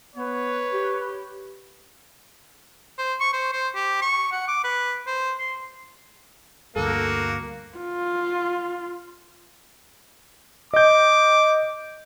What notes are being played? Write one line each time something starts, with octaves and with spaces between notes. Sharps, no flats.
B3 B4 C#5
G4
C5
C#6
C5
C5
G4
C#6
F#5
D6
B4
C5
C6
D2 G2 A#3 F#4 A4
F4
D#5 D6 G6